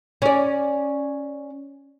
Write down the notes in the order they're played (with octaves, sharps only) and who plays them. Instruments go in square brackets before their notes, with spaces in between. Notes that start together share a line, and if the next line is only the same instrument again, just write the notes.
[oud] C#4 D5